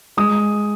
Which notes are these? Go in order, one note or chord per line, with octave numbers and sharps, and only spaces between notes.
G#3 D#6